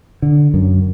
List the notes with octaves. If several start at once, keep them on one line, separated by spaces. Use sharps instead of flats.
D3
F#2